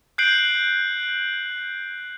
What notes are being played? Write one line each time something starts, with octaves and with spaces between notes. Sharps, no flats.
F#6 G6 C7 D7 F#7